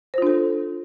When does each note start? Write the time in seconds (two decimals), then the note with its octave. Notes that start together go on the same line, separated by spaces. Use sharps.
0.14 C5
0.18 F4
0.22 D4
0.27 A4